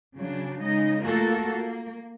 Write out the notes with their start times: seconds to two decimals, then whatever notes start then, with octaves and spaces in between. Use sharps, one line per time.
0.17 C#3 F#3 D4
0.62 C#3 G#3 D#4 D#5
1.03 A3 A#3 F4 F#4 A4 A#4
1.49 A#3